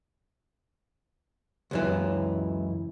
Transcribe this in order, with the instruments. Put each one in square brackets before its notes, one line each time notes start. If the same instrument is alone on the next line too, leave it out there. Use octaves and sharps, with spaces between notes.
[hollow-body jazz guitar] C#2 F#2 E3